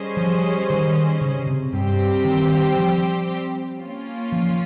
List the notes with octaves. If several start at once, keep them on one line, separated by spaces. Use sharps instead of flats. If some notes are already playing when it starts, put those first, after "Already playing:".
Already playing: G3 C#4 G#4 C5 D#5
F3
D#3
C#3
C3
G2 G3 C4 G4 C5
D#3
F3
A#3 C#4 F4
F3